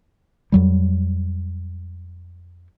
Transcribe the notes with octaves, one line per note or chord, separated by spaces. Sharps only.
F2 F#3 G3